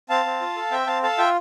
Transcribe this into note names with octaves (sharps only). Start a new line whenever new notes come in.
C4 F5 A5
C4
F4
A4
C4 E5 G5
C4 F5 A5
A4 F5 A5
F4 E5 G5